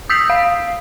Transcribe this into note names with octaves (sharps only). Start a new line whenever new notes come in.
D#6 E6 G6 B6 C7
F5